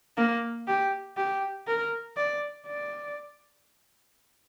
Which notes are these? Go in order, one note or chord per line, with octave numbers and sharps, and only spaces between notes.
A#3
G4
G4
A#4
D5
D5